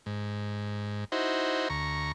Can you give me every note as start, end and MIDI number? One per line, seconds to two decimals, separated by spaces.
0.06 1.05 44
1.12 1.68 63
1.12 1.68 64
1.12 1.68 66
1.12 1.68 72
1.70 2.12 38
1.70 2.12 82
1.70 2.12 85